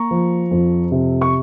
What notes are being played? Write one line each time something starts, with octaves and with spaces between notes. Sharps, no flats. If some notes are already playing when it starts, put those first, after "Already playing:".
Already playing: A#3 A#5 C#6
F3
F2
C3
C#6